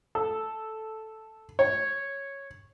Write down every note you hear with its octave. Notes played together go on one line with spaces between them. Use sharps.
A4
C#5